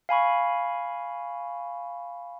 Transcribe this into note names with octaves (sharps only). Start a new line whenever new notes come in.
F5 G#5 B5 C#6